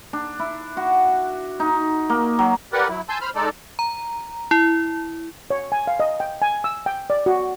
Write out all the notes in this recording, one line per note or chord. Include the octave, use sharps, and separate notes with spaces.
D4
E4
F#4
D#4
A#3
F#3
G4 A#4 B4 D5 F#5
F#3 E4
G#5 A5 C6 E6 G6
C5 B5 F6
G#3 D#4 A4 D5
A#5
E4
C#5
G#5
F5
D#5
G5
G#5
E6
G5
D5
F#4